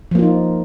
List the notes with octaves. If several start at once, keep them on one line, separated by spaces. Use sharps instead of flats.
F3 A#3 D#4 F4